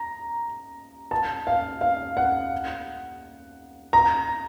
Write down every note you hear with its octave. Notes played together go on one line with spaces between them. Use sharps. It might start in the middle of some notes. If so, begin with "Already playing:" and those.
Already playing: A#5
A5
F5
F5
F#5
A#5